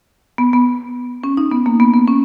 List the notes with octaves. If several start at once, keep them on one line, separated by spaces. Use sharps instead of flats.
B3
B3
C#4
D#4
B3
A#3
B3
B3
C#4